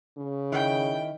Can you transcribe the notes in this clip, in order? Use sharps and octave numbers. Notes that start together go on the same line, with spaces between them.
C#3
D#3 E4 D#5 G5